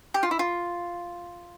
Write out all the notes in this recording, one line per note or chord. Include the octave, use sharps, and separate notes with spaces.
G4
F4
E4
F4